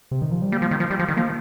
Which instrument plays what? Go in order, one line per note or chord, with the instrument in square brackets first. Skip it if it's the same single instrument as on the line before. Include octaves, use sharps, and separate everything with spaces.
[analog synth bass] C3
D#3
F3
G3
[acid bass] G3 [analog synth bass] A#3
[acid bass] F3
D#3
F3
G3
F3
D#3
[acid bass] F3 [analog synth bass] A#3